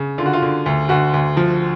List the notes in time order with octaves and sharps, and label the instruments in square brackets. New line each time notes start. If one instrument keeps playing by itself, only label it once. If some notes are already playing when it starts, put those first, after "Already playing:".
Already playing: [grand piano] C#3
D3 F4
F#4
F4
D3
D2
D2 F#4
D2
F3